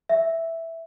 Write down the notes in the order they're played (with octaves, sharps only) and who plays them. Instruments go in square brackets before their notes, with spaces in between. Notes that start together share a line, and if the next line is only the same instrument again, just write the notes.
[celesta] E5